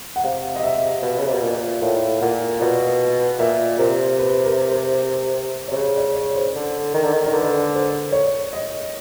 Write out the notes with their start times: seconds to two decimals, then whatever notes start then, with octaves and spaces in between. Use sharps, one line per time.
0.16 F#5
0.24 C3 F5
0.56 D#5
0.63 E5
1.02 B2
1.19 C#3
1.26 C3
1.34 B2
1.42 A#2
1.82 A2 F5
2.21 A#2 F#5
2.61 B2 F5
3.39 A#2 E5
3.78 C3 A#4
4.18 B4
4.44 A#4
4.71 C5
5.68 C#5
5.71 C3
5.76 C#3 C5
5.96 D5
6.15 C#5
6.35 C5
6.55 D3
6.94 D#3
7.04 D3
7.13 D#3
7.23 D#3 A#4
7.33 D3 B4
7.74 C5
8.12 C#5
8.53 D#5